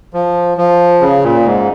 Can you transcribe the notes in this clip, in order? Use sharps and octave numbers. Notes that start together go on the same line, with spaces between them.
F3
F3
C#3
A#2
G#2